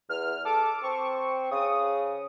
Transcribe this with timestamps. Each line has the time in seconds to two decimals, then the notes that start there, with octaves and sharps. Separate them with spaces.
0.09 E2 F6
0.45 A4 D6
0.84 C4 C#6
1.51 C#3 D#6